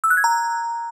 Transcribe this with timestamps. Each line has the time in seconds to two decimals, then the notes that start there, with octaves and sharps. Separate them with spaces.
0.04 E6
0.10 F#6
0.17 G#6
0.24 A#5